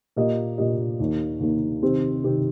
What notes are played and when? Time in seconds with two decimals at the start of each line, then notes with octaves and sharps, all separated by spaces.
0.16 A#2 A#3 G4 D#5
0.58 A#2 A#3 G4 D#5
1.00 D#2 D#3 A#3
1.40 D#2 D#3 A#3
1.83 C3 D#3 C4 G4
2.23 C3 D#3 C4 G4